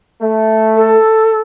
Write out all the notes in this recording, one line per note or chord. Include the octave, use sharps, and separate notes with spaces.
A3
A4